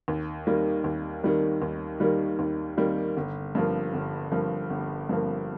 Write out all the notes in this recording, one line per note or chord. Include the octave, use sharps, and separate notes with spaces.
D#2
D#3 G3 A#3
D#2
D#3 G3 A#3
D#2
D#3 G3 A#3
D#2
D#3 G3 A#3
G1
G2 F3 A#3
G1
G2 F3 A#3
G1
G2 F3 A#3